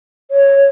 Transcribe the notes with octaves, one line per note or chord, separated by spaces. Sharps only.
C#5